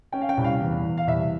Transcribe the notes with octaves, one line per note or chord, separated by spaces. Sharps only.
C#4 G5
F5
G5
C2
F5
E2
E2
F5
C2 E5